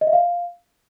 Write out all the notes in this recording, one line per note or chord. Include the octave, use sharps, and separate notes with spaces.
D#5
E5
F5